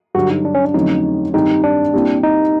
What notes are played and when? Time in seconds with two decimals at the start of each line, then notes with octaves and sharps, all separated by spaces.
0.15 G2 D3 F#3 F#4
0.30 D#4
0.45 D4
0.55 C#4
0.65 D4
0.74 F2 D3 F#3 A3 C#4 D#4
1.34 G2 D#3 G3 C4 D#4
1.64 D4
1.93 C2 A#2 G3 C4 E4
2.23 D#4